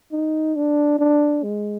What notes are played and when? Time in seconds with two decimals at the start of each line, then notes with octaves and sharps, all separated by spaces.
0.12 D#4
0.56 D4
0.99 D4
1.44 G#3